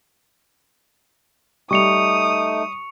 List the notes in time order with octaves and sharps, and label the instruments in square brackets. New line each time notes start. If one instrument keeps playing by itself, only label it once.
[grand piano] G3 [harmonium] A3 D#4 [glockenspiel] C#6 C#7 F7 [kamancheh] D#6